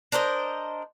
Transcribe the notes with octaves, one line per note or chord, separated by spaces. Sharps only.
D4 A#4 C5 D#5